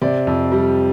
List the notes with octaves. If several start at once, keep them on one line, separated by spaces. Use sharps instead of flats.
C3 D5
F2
G3